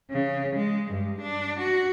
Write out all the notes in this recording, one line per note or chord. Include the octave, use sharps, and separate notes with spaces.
C#3
G#3
G2
D4
F#4